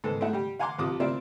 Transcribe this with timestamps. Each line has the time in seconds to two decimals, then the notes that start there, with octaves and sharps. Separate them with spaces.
0.04 G#2 D#3 B3 A4
0.20 G#3 A3 D#4 E4 F#5
0.33 G3 G4
0.59 F5 F#5 G#5 A#5 C6 D6
0.78 A1 C3 F3 D6 D#6
1.00 A#3 C4 E4 F4 A#4 D5